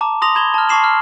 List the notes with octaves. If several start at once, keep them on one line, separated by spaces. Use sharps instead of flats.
A5 A#5 D6
C6 D#6 A#6 F7
B5 G#6 E7 G7
A5 F6
A5 C#6 D6 C7 E7 F#7
B5 F6